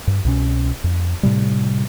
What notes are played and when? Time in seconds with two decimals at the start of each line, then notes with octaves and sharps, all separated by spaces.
0.07 G2
0.25 C2 B2 C#4
0.84 F2
1.23 A2 C3 G3